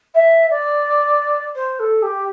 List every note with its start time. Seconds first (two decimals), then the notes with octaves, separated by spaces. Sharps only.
0.15 E5
0.50 D5
1.55 C5
1.79 A4
2.02 G4